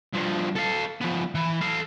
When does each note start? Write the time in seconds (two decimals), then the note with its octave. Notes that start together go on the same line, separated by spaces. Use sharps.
0.14 G2 F3
0.56 A4 F5
1.01 F3 B3
1.35 E3
1.61 A4 F5